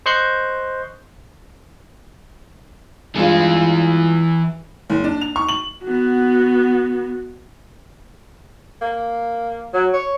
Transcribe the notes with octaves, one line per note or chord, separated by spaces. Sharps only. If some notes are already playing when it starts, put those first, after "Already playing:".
C5 D#5 C#6 F#6 G6 C7
G2 E3 G#3 F4 G#4
F#1
D4
F7
C#6
F#7
B3 F#4
A#3
F#3
C#5